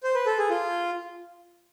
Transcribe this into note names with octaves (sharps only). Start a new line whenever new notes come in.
C5
B4
A4
G#4
F4